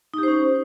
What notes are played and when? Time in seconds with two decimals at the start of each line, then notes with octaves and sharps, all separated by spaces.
0.14 D#4
0.18 G4
0.23 C5
0.28 C#4